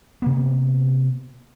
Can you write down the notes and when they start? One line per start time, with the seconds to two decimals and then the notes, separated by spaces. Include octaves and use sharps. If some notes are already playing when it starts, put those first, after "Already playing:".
0.22 C3 A#3 B3